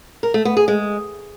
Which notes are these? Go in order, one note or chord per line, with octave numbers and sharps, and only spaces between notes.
A#4
A3
B3
G#4
G#3